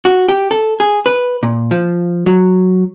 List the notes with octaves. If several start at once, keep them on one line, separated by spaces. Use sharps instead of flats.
F#4
G4
A4
G#4
B4
A#2
F3
F#3